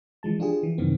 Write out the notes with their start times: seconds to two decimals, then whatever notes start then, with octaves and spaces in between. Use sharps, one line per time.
0.23 E3 F3 G#3 A5
0.39 F3 D4 F4 G4 G#4
0.63 E3
0.78 F#2 C3 D#3 B3 C4